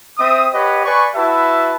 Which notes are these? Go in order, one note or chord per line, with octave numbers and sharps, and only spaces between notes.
C4 E5 D#6
G4 B4 C#5 D#5 F#5
B4 D5 G#5 C#6
E4 F#4 B4 E5 A5